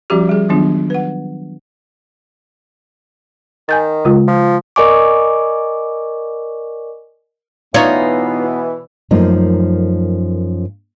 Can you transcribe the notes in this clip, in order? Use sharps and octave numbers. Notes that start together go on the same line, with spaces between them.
F3 G3 C#4 F#4 G4
G3 G#4
D#3 F#3 B3 D4 F4
B4 F#5
D#3 G#5 G6 A6
C#3 G#3 F4
F3
A#4 D5 D#5 G#5 C#6 D6
B2 E3 B3 D#4 F4 C#5
F#2 F3 A3 A#3 D#4